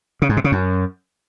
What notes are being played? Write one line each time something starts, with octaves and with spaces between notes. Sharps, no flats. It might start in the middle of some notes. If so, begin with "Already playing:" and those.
C#3
G#2
C3
C#3
F#2